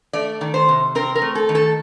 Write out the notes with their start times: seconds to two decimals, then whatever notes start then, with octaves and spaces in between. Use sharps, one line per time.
0.13 A3 D5
0.41 D#3
0.54 C5
0.68 C3
0.95 C4 A#4
1.15 A#4
1.22 A3
1.35 A4
1.49 D#3
1.55 A4